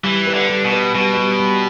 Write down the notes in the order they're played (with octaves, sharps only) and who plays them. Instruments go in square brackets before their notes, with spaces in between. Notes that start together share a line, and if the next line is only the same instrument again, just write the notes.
[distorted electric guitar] E3 [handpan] G3
[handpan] B4
[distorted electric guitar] D3
[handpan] G3
[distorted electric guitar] B2
[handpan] B4
[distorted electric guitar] B2 [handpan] G3
[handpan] G3
G3